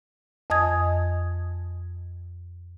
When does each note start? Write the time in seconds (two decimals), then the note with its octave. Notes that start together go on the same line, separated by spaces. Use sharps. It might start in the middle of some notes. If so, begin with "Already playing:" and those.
0.50 F2 D#5 G#5 D#6 G#6